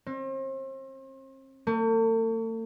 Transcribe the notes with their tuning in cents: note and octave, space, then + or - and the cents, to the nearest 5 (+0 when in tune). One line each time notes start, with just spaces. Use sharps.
C4 +40
A3 +45